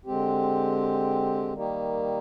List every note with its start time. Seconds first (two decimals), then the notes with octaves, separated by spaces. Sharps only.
0.05 D3 G#3 C4 G4
1.53 D#3 G3 A#3 D#4 G4